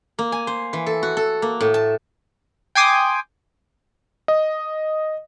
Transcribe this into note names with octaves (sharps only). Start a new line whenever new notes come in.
A#3
G#5
C5
E3
A4
F#4
A4
A#3
A2
A5
G5 G#5 C6 D6 D#6
D#5